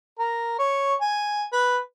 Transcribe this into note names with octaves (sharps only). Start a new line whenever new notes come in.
A#4
C#5
G#5
B4